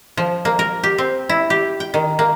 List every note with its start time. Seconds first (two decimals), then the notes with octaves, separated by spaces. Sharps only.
0.17 F3
0.45 A#3
0.59 A#4
0.83 G4
0.98 C4
1.29 E4
1.50 G4
1.80 G5
1.94 D#3
2.19 A#3